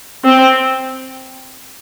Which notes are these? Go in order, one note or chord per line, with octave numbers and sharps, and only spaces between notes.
C4